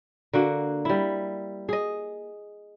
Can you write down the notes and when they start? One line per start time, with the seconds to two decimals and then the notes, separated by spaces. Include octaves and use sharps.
0.33 D3 A#3 F#4
0.85 G3 E4
1.69 G#4 D#5